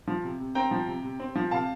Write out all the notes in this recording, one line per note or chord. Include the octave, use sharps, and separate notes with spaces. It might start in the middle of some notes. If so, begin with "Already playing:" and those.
F3
C3
C3
C4 G5 A#5
F3
C3
C3
C4
F3
C3 F5 A5